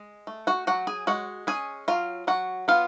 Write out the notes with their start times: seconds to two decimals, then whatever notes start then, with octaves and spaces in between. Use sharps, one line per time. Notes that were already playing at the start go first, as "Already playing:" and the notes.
Already playing: G#3
0.27 A3
0.47 F#4 F#5
0.67 F#3 F#4 F#5
0.87 G#4 G#5
1.07 G#3 F#4 F#5
1.47 C#4 G#4 G#5
1.88 F#3 F4 F5
2.27 F#3 F#4 F#5
2.68 B3 F4 F5